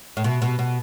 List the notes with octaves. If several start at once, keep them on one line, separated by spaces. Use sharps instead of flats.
A2
B2
B2
B2